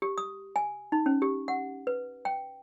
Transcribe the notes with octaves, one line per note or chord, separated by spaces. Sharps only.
G4
D#6
G#5
D#4
C#4
G4
F#5
B4
G5